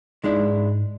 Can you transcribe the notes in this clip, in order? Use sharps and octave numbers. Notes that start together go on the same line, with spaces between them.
G#2 G#3 D4 E4